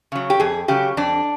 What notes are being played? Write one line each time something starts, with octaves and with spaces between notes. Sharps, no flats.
C#3 F#3
G4
F2 G#4
C#3 F#3 G4
F2 D4